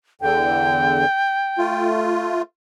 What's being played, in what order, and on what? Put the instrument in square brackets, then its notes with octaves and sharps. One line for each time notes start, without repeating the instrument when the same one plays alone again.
[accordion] E2 D3 [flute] G5
[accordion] A3 F4